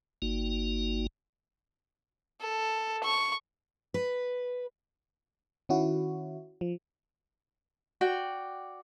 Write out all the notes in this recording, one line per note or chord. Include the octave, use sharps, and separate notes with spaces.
G1 A#3 D#4 F#4
A4
C#6
B4
D#3 C#4 E4 F#4
F3
F#4 D5 G5